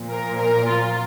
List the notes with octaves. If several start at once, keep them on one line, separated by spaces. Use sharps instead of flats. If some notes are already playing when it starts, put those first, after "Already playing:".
Already playing: A#2 F3
A#4
A#4
F4